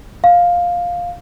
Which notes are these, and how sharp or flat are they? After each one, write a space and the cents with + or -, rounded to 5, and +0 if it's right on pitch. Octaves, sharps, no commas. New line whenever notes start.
F5 +10